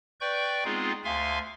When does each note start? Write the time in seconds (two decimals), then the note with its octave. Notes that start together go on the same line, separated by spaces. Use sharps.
0.21 B4 D5 G5 C#6 G6
0.65 G#3 B3 C4 D#4 F4 G#4
1.04 D2 E5 F5 G#5 C6